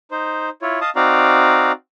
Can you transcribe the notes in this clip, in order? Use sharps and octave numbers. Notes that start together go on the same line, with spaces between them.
D#4 C5
E4 F4 C#5
D#5 F5 A5 D#6
C4 D#4 F#4 D5 F5 A#5